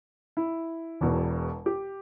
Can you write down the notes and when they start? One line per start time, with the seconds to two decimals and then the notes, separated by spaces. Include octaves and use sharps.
0.37 E4
1.01 E1 E2 B2
1.66 G4